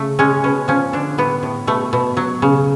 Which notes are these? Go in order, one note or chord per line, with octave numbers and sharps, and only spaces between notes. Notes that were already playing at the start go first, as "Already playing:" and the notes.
Already playing: C#3 A3
G#3 C#4
B2 C#4
F3 C#4
D3 D4
A2 B3
A2
B2 A3
B2
F#3
C#3